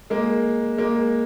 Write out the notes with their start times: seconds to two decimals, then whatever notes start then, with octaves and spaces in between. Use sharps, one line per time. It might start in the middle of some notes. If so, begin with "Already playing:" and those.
0.10 G#3 A#3
0.78 G#3 A#3